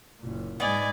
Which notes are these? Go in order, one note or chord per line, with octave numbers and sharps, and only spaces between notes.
F#1 A#2
G#2 G#3 B3 D5 D#5 G#5